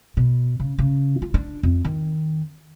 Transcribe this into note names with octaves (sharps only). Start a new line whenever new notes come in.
B2
C#3
C#3
F4
D4
F2
D#3